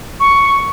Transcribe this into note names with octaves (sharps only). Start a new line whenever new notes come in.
C#6